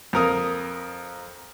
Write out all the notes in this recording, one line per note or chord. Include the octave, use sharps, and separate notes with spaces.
F2 A#4 D#6